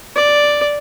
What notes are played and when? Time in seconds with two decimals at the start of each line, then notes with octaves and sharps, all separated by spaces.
0.16 D5